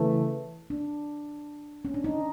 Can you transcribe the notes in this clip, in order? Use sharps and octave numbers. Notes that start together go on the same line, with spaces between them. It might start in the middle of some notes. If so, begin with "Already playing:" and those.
Already playing: C#3 E3 A3
D4
C#4
D4
D#4